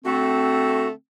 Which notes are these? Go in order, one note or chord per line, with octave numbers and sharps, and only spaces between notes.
D3 A3 C4 F#4